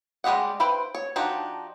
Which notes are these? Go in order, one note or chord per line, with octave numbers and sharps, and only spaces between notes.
G3 G#3 G4 D#5 F#5
E4 B4 C5 G5
C#5
F3 D4 D#4 F#4 G4